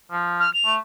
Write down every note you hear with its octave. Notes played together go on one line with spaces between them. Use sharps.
F3
F6
F7
A3